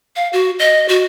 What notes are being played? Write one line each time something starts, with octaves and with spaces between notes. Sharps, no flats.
F5
F#4
D#5
F#4